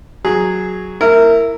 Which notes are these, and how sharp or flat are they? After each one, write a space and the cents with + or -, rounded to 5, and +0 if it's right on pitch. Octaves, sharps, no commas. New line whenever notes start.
F#3 +0 G#4 +0
A#3 -45 E4 +0 A#4 -15